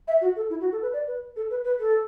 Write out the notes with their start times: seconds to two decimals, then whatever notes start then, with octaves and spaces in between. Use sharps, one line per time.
0.08 E5
0.21 F#4
0.36 A4
0.50 E4
0.61 F#4
0.72 A4
0.82 B4
0.93 D5
1.07 B4
1.36 A4
1.50 B4
1.64 B4
1.80 A4